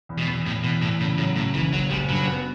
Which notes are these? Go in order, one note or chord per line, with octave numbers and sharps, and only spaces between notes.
E2
B2
E2
E2 A2
E2 B2
E2 A2
A2 C#3
A2 F#3
A2 C#3
F#1 E3
F#1 F#3
F#1 G3
G2 F#3
B3